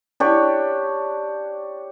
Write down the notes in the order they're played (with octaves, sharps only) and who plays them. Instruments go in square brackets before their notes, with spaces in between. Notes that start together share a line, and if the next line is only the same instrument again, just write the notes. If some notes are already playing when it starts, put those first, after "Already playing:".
[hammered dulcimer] D4 G4 C#5